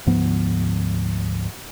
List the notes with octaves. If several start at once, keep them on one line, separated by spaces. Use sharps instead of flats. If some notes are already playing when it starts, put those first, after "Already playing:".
D2 G#2 F3 B3